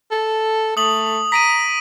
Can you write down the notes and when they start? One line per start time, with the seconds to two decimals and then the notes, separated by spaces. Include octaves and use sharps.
0.11 A4
0.77 A3 D#6 F#7
1.32 A#5 B6 D7 D#7